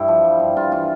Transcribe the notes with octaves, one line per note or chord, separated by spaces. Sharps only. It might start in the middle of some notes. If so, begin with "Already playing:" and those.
Already playing: G2 E4 G4
F3
G3
G2
G2 F4
E3 F4